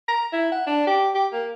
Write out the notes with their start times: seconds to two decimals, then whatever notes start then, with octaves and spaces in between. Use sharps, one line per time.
0.08 A#5
0.33 E4
0.52 F#5
0.67 D4
0.87 G4
1.14 G4
1.33 A#3